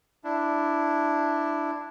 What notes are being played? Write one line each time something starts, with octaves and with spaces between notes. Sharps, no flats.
D4 E4